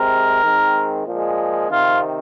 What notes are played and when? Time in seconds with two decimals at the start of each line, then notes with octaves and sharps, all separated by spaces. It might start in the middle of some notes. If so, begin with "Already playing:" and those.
Already playing: C3 G#3 C4 A#4
0.43 D#3 G#3 C4
1.06 A#2 F3 G#3
1.69 C3 D#3 C4 F4